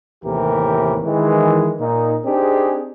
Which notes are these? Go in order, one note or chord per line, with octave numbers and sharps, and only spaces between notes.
D#2 A2 C3 E3 G4 A#4
D#3 E3 G#3
A#2 D#4
C4 D4 D#4 G4 G#4